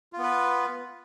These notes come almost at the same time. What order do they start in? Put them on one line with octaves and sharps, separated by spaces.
F4 B3 B4